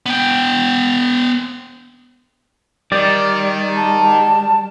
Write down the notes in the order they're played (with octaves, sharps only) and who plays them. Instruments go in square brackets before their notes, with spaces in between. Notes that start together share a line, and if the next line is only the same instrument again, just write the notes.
[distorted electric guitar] B3 G5
[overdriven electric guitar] D#3 [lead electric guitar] G3 [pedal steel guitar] D5
[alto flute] A5